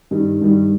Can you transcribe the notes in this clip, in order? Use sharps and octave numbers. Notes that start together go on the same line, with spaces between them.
G2 D#3 G3
G2 D#3 G3